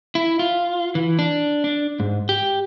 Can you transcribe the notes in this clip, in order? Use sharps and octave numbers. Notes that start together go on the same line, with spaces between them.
E4
F4
E3
D4
D4
G#2
G4